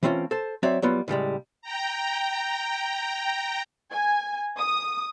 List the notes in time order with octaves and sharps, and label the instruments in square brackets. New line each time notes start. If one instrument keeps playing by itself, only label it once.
[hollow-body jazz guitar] E3 A3 C4 C#4 F4
A4 C5
F#3 C4 C#5 D5 E5
F#3 G3 B3 F4
A2 C#3 G3 G#3
[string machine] G5 A#5
[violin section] G#5
D#6